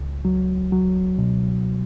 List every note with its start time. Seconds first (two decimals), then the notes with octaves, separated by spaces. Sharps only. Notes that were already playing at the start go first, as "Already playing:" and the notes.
Already playing: C#2
0.25 F#3
0.72 F#3
1.18 B2